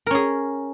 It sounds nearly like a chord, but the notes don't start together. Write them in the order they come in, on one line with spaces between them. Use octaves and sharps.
A#4 C#4 G#4